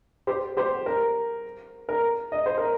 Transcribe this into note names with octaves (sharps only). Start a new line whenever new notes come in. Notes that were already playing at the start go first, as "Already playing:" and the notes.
G4 C5
G4 C5
A#4
A#4
D#5
C5
A#4